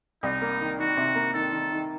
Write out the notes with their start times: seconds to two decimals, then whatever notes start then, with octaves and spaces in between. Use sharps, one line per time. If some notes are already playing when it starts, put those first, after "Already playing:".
0.23 C2 D#4
0.42 A#3
0.61 D#3
0.79 D#3 F#4
0.97 C3
1.15 A#3
1.34 D#3 A4
1.52 D#3
1.72 D#3